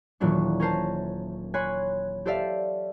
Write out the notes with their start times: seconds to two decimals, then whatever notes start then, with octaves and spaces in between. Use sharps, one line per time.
0.20 D#1 A#2 E3 F#3 D4 C#6
0.60 C#4 A#4 C5 A5
1.54 C#5 G#5 B5 C6 F#6
2.25 G4 A4 C5 D5 E5 F5